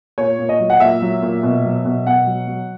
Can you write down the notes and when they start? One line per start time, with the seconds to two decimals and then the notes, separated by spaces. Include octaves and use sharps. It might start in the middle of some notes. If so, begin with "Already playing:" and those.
0.18 A#2 C#5
0.39 A#2
0.49 D#5
0.60 F#3
0.70 F#5
0.80 A#2 E5
1.02 F#3
1.23 A#2
1.43 B2
1.65 F#3
1.85 B2
2.06 B2 F#5
2.27 F#3
2.48 F#3